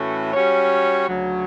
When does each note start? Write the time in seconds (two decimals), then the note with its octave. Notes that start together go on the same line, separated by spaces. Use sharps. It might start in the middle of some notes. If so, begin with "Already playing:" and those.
Already playing: A2 E3 A3 C#4 F#4
0.33 G3 C#4 F#4 C#5
1.08 D2 C#3 F#3